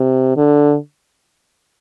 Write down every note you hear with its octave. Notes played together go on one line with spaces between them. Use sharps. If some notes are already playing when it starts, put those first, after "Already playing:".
Already playing: C3
D3